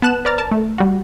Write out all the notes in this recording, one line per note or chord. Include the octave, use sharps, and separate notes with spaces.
B3 A5 F#6 E7
B4 C5 D5 A#5 F6 A6
A#4 A5
A3
G3 F#4